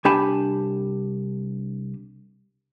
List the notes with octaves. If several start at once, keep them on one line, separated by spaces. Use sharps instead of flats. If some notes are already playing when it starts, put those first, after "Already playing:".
C2 D4 G4 G#5 A5 B5